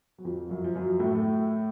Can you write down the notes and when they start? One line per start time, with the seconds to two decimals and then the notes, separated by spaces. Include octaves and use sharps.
0.18 F#3
0.25 F2 F3
0.50 F#2 F#3
0.64 F3
0.75 F#2 F#3
1.00 A2 A3